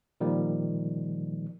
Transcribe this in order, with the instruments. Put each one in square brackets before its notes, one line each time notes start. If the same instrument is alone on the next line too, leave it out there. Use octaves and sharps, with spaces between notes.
[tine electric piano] A#2 D#3 F3 G3